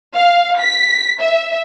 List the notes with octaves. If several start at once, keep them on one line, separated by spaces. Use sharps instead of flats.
F5
B6
E5